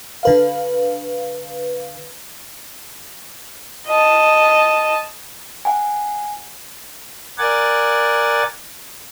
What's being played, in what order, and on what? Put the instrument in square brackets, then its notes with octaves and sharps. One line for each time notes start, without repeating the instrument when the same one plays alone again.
[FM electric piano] D3 B4 F5
[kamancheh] D#5 A5
[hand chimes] F#5 G#5
[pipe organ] A#4 D5 F#5 G#5 A6